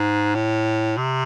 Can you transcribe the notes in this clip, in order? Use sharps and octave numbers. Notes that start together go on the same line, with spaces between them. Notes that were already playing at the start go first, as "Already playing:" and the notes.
Already playing: G#2
A2
C3